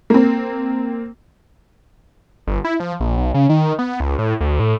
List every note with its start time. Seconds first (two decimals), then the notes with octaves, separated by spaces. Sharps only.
0.10 A#3 C4
2.47 G1
2.65 E4
2.80 F3
3.00 A#1
3.17 B1
3.34 C#3
3.49 D#3
3.79 B3
4.00 C#2
4.18 A2
4.41 D2
4.60 A2